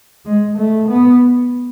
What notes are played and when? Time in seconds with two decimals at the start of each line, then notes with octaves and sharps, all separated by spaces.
0.26 G#3
0.58 A3
0.89 B3